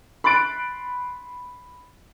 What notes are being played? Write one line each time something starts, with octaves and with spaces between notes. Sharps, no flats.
B5 C6 F#6 A6 D7